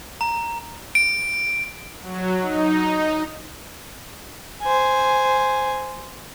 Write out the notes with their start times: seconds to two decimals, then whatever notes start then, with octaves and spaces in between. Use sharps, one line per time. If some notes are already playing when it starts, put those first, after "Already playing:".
0.21 A#5
0.95 D7
2.02 F#3
2.41 D#4
4.63 C5 G#5